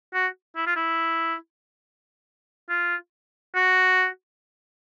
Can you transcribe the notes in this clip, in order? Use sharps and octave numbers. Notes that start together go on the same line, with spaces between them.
F#4
E4
F4
E4
F4
F#4